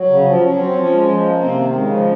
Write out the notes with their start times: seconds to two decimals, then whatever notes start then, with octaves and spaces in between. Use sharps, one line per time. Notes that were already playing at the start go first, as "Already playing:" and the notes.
Already playing: F#3
0.10 C#3
0.26 F3
0.42 F#3 C#4
0.59 C4
0.76 F3
0.92 G#3
1.09 F3
1.25 A#3
1.41 C3 C4
1.58 D#3
1.75 C#3 G#3
1.91 F3